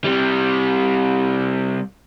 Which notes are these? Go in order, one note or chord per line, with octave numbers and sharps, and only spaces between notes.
C3 G3